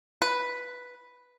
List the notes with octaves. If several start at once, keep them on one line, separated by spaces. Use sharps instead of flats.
B4